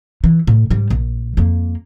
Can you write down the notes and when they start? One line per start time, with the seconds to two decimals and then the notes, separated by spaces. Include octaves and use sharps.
0.24 E3
0.47 A2
0.70 G#2 G3
0.90 A#1
1.37 F2 A#3